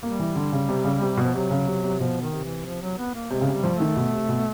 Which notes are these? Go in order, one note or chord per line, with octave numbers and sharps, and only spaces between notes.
G3 A#3
E3
D3
C#3
C3
C#3
C3
B2
F3
C3 F#3
C#3
C3
C3
B2 F3
D#3
C3
E3
F3
F#3
B3
A#3
C3 G#3
C#3
C3
G3
F3
A3
D#3
B2
C3
B2